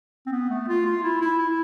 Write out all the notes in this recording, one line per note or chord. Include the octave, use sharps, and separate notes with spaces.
C4
B3
A3
F4
F4
E4
E4
E4